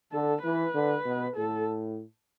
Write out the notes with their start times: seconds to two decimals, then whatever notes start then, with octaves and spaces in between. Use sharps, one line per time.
0.12 D3 A4
0.43 E3 B4
0.74 D3
1.05 B2
1.37 A2 A4